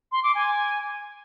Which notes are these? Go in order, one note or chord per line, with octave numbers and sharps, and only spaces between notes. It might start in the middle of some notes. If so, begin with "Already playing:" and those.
C6
D6
G#5